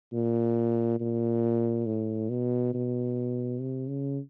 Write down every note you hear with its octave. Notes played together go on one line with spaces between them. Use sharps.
A#2
A#2
A2
B2
B2
C3
C#3